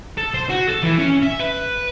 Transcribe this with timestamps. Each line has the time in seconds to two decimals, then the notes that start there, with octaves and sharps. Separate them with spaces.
0.17 A4
0.34 C5
0.50 F#4
0.69 A4
0.83 E3
0.98 C#4
1.23 E5
1.40 B4